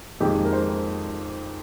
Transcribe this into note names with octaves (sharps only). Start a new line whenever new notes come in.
F2 D#3 G#3 G4
A#4
C5